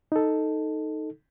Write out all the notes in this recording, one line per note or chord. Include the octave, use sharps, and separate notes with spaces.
D#4 A4